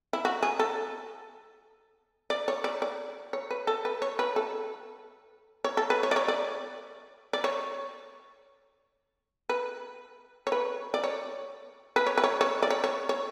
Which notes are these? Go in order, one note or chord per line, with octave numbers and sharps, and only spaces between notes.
E4
F#4
G#4
A4
D5
C#5
D5
D5
C#5
B4
A4
B4
C#5
B4
A4
C#5
A4
B4
C#5
D5
C#5
D5
D5
C#5
B4
C#5
B4
D5
C#5
B4
C#5
B4
C#5
C#5
D5
C#5
C#5
C#5